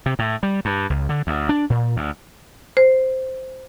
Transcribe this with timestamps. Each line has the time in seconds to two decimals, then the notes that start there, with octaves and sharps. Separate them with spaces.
0.06 C3
0.19 A2
0.43 G3
0.65 G2
0.90 C#2
1.09 D3
1.27 D2
1.49 D4
1.70 A#2
1.96 D2
2.77 C5